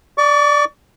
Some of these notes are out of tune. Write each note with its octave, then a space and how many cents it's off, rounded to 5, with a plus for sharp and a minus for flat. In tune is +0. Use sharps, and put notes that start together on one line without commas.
D5 +0 C#6 +45